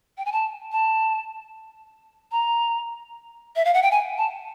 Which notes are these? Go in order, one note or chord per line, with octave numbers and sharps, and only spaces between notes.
G5
G#5
A5
A5
A#5
E5
F5
F#5
G5
G#5
A5